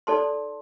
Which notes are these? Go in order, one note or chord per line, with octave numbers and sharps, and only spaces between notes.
D#4 A4 D5 A5 C6